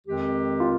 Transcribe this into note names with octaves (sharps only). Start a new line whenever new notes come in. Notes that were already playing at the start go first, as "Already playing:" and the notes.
F2 D#3 G#3 C4 G4
F4